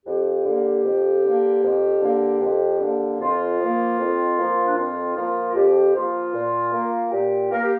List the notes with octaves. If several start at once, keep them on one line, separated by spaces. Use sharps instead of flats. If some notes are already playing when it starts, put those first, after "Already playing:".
F2 G4
D3 A#3
F2
D3 A#3
F2
D3 A#3
F2
D3 A#3
F2 F4
F3 A#3
F2
F3 A#3
D4
F2 F4
F3 A#3 F4
A#4
F2 G4
F3 A#3 F4
A#2
A#3
A#2 G4
A#3 A#4
G4